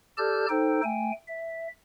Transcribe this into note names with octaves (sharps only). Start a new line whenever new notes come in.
G4 A4 D5 A5 F6 G6
D#4 A4 C5 G5
A3 G5 G#5
E5